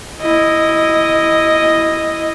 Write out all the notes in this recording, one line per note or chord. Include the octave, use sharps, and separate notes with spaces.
E4 D#5